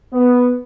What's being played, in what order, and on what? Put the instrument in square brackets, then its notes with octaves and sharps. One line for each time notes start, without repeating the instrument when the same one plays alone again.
[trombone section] B3